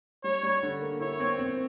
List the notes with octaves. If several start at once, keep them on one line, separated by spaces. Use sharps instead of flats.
G3 C#5
G3
D3
A#3
E4 C#5
C4
C4